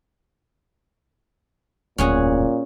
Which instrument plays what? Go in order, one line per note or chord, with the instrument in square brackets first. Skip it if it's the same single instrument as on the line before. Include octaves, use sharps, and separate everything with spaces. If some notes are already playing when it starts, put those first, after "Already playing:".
[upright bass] D1 F2 [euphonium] A#2 [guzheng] C#4 F#4 G#4